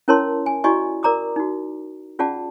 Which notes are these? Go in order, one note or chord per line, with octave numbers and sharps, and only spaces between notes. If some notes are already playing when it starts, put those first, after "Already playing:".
C#4 E4 A#4 C#5 A5 C6
G#5
E4 F#4 D5 D#5 G#5 C#6
A#4 D5 A#5 D6 D#6
D#4 F#4
C#4 F4 G#4 D5 F#5 A5